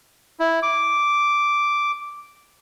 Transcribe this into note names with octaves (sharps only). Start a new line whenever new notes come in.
E4
D6